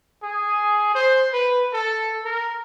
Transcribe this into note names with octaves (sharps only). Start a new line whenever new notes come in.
G#4
C5
B4
A4
A#4